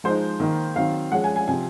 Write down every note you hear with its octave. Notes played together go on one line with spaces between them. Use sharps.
F3 G#3 D#4 C5
D#3 A#3 D#4
D#3 F#3 C4 F5
F3 G#3 C#4 F#5
G#5
G#5
C3 F3 C4 G#5